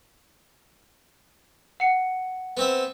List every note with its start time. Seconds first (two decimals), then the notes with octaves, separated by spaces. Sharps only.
1.80 F#5 C#7
2.57 B3 C4 E5